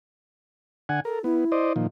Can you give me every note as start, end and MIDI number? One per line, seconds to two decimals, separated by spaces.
0.89 1.00 50
0.89 1.00 78
0.89 1.00 80
1.05 1.23 69
1.05 1.19 70
1.24 1.44 59
1.24 1.73 64
1.52 1.73 72
1.52 1.73 74
1.52 1.73 75
1.76 1.87 46
1.76 1.87 51
1.76 1.87 53